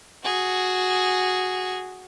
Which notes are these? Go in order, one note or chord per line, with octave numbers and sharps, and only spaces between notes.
F#4 G#4